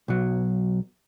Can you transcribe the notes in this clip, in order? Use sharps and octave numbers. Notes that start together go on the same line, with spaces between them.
B1 F#3